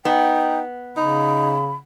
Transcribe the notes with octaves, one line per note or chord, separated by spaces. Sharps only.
B3 D#4 G5
C#3 D#4 B5